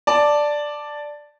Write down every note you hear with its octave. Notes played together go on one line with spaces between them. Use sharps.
D5 A5